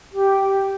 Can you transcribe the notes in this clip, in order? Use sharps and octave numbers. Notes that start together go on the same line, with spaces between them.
G4